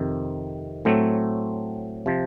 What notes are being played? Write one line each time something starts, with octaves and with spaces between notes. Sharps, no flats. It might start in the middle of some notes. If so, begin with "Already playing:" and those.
Already playing: F2 C3 D#3
A2 F#3 A3 C4
C3 F3